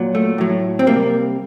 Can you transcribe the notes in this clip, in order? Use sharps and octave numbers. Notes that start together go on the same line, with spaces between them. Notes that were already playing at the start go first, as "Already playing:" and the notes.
Already playing: A#2 F#3
A3
A2 F#3
C4
C3 G3 A#3